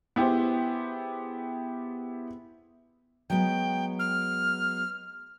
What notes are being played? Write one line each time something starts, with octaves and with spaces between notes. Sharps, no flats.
B3 E4 G4 G#4 C5
F#3 G#3 B3 G5
F6